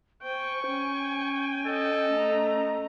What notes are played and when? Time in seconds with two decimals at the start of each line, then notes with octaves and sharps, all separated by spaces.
0.22 C5 G5 G#5 C#6
0.67 C#4 G5 G#5
1.67 A4 D#5
2.11 A3 A#5